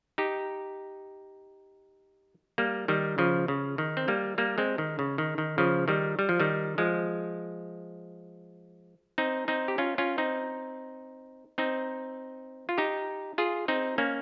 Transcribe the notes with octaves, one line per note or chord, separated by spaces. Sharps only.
D#4 G4
G3 A#3
D#3 G3
C#3 F3
C#3
D#3
C4
G3 A#3
G3 A#3
G#3 C4
D#3
C#3
D#3
D#3
C#3 F3
D#3 G3
G3
F3
D#3 G3
F3 G#3
C4 D#4
C4 D#4
G4
C#4 F4
C#4 F4
C4 D#4
C4 D#4
F4
D#4 G4
F4 G#4
C4 D#4
A#3 C#4